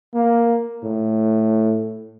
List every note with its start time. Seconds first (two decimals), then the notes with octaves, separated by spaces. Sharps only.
0.14 A#3
0.83 A2